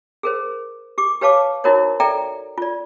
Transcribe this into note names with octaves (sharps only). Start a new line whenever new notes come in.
G#4 A#4 C5
G4 D6
G4 B4 C#5 F5 A5 D6
D#4 E4 F#4 A#4 C5 C#5
A4 D5 E5 G5 A#5
F4 D5